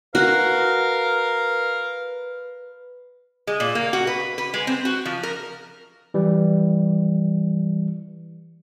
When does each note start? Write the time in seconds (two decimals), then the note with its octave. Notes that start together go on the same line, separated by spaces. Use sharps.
0.15 F#4 A#4 B4 F5
3.47 G#3
3.60 A#2
3.75 A#3
3.93 F#4
4.07 B4
4.38 B4
4.54 G#3
4.67 C4
4.85 F#4
5.06 F3
5.23 A#4
6.14 E3 G3